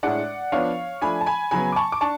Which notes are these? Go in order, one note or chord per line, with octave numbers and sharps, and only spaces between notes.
A2 G#3 D4 D5 F#5
F3 B3 D4 C#5 F5
F3 A3 D4 G#5 B5
A5
G#5 B5
C#3 F#3 B3 G#5 B5
D6
A5 C#6
D6
D4 A5 C#6